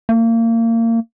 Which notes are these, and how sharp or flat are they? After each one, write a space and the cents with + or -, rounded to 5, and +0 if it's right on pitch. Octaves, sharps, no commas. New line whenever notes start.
A#3 -30